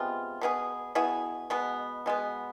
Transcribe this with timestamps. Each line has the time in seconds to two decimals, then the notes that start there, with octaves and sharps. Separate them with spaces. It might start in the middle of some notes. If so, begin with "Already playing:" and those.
Already playing: C3 G#3 B3 F4
0.41 B2 B3 E4 G#4
0.95 B2 B3 E4 G#4
1.50 B2 G#3 B3
2.06 B2 G#3 B3